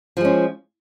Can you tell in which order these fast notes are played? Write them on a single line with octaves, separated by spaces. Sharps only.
F3 G#3 C#4